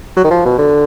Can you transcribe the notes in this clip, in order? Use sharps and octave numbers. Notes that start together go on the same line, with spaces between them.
F#3
D#3
F3
B2
D3